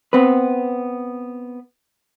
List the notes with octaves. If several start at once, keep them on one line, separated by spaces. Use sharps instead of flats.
B3 C4 B4